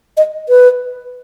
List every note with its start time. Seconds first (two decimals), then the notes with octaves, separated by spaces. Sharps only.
0.17 D#5
0.49 B4